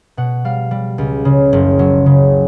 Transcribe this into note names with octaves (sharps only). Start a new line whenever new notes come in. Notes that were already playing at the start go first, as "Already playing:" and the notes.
B2 F#5
G3 F5
G3
C#2
C#3
F#1
F#3
C#3